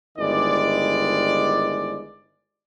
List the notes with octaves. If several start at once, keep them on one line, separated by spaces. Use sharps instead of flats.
G1 D#3 G#3 E4 D5